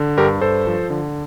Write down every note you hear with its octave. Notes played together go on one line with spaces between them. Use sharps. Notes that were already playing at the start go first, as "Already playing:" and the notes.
Already playing: D3
G2 G4 A#4
G2 A4 C5
F3
D3